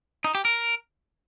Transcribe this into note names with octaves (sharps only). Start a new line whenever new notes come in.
D#4
G4
A#4